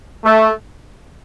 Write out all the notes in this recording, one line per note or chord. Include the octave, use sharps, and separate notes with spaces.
A3